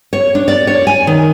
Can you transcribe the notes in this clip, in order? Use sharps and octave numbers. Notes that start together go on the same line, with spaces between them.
C#5
D4
D5
C#5
G#5
D#3